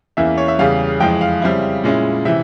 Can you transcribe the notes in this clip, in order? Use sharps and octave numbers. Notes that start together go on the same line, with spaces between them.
E2 E3 A#3 C#4 E4 E5
C#5
E5
E2 C#3 G3 F5
F2 E3 G#3 G5
F5
C#3 G3 C4 E4
A#2 G#3 C#4 E4
C3 E3 E5